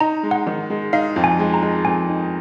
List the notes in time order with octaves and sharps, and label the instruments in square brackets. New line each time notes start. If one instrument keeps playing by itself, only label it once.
[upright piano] D#4 [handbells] A#5
[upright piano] G#3
[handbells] F#5
[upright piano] D#3
G#3
[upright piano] D#4 [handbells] F5
[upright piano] F2
[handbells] G#5
[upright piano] G#3
[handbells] A#5
[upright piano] G#3
[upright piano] F2 [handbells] G#5
[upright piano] D#4